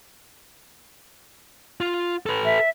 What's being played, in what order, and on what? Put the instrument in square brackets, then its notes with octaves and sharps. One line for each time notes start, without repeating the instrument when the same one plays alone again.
[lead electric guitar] F4
A4 B4
[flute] E5